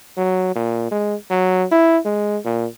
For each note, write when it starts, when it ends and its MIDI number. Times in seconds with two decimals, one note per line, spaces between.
0.17 0.51 54
0.55 0.86 46
0.91 1.15 56
1.30 1.65 54
1.71 1.98 64
2.05 2.37 56
2.45 2.66 46